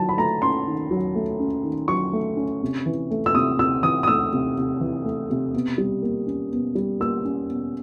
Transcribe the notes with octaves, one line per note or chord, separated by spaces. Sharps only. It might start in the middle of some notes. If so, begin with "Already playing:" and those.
Already playing: D#3 F#3 A5
B5
A3 A#5
C#4 C6
D#3
F#3
A3
C#4
D#3
F#3 C#6
A3
C#4
C3
E3
A3
E6
C3 D#6
C3 E6
E3 D#6
D#6
A3 E6
C3
C3
E3
A3
C3
B2
G3
A#3
C#4
B2
G3
A#3 E6
C#4
B2